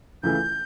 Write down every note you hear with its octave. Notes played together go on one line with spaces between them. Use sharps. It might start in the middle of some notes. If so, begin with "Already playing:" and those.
C#2 C#3 E3 A3 E4 G6